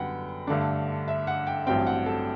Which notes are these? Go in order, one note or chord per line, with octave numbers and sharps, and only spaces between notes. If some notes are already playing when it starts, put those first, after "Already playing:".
Already playing: F#2 D3 G3 B3 F#5 G5
G2 D3 A3 D4
E5
F#5
G5
A1 G2 F#3 C4 G5
F#5
A4